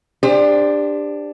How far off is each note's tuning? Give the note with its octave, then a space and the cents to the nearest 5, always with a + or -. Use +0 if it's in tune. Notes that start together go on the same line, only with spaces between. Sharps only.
D4 +5 G4 +30 C5 +0